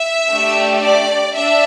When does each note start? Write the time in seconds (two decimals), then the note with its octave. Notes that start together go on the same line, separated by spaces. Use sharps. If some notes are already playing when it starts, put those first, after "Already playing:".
Already playing: E5
0.30 A3 D4 G4
0.82 D5
1.35 D4 E5